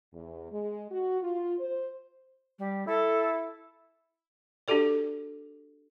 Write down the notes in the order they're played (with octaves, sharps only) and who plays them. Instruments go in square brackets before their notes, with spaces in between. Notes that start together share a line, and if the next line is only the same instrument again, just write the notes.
[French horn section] E2
G#3
F#4
F4
C5
[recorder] G3
[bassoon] E4 [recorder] A4
[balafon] D4 F#4 G4 A4 D5